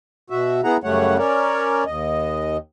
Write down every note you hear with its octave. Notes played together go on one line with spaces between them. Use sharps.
B2 F#4 E5
B3 E4 G#4 F#5 A#5
F#2 C#3 G3 A3 C#5 F#5
C#4 A#4 C#5 D5
D#2 D#5